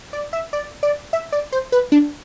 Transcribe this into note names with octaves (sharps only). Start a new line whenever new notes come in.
D5
E5
D5
D5
E5
D5
C5
B4
D4